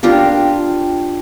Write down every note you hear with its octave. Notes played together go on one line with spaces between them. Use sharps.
D4 F4 G4 A#4